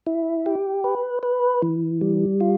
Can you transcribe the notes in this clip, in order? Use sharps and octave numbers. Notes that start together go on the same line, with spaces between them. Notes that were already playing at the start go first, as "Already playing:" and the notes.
E4
G4
B4
B4
E3
G3
F4